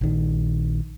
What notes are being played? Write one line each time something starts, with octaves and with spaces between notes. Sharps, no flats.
A#1 D#3